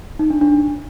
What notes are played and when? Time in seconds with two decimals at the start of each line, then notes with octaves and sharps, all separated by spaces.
0.19 D#4
0.30 D4
0.41 D4